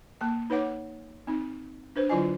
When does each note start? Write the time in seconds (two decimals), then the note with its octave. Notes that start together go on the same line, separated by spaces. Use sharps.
0.21 A#3 A5
0.50 D#4 B4 C#5 F#5 D6
1.27 C4 D#4
1.96 D4 B4 C5
2.09 D3 F#3 E4 F4 D#5 G#5